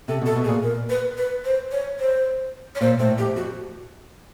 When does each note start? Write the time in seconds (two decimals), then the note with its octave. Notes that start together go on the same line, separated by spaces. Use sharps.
0.08 C3 A4
0.22 B2 A4
0.36 B2
0.44 G#4
0.48 A#2
0.63 A#4
0.90 B4
1.17 B4
1.45 C5
1.71 C#5
1.99 C5
2.75 C#5
2.81 A#2 C5
2.99 A2 C5
3.18 F2 G4
3.36 F2 F#4